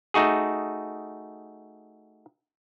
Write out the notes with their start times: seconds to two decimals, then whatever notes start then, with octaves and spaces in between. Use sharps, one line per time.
0.14 A3 D#4 F#4 G#4